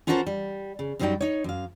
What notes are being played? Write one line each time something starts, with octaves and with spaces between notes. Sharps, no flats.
C#4 F4 F#4 A4 A#4 C5
G3
C#3
F#2 E3 F#3 G3 D#4 G5
D#4 C#5
F#2 F5